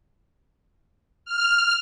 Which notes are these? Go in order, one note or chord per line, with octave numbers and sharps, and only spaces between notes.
F6